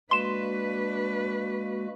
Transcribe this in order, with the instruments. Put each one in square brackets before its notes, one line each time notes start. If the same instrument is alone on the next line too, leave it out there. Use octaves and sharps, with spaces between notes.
[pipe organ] G#3 A#3 F#4 [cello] D4 B4 [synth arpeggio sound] C6 E7